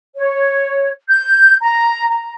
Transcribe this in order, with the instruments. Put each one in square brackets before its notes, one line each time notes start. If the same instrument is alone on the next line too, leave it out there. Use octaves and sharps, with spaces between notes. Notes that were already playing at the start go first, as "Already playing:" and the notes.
[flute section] C#5
G6
A#5
A#5